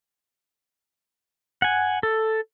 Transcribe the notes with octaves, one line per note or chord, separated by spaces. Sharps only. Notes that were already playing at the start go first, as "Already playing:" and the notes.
F#5 G#5
A4